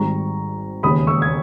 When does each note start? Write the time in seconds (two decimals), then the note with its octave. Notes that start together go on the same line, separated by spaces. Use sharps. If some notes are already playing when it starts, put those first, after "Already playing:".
Already playing: G#1 G#2 G3 A#5 C#6
0.83 E1 D#2 C#3 G#3 B5 D#6
1.07 C#6 E6
1.22 G#6